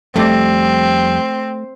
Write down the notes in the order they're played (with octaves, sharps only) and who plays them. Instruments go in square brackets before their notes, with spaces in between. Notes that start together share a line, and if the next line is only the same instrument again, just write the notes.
[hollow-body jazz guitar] F2 G3 D5 [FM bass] A3 [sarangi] C4